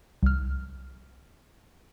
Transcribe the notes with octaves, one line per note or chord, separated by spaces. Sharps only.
C2 F6